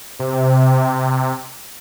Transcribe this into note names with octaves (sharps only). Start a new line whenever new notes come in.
C3